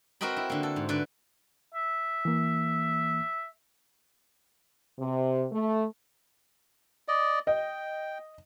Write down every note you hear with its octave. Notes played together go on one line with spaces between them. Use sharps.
C4 F#4 A#4 D#5 G5 B5
E4
D3 A#3
A4
G#2
D3 B4 D5
E5
E3 A#3
C3
A3
D5 D#5
D#5 G5